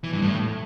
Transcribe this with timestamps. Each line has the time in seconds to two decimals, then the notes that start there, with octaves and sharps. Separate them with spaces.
0.04 E3
0.13 G2
0.22 A2